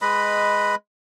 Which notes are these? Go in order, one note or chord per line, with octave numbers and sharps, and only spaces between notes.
G#3 B4 D#5 B5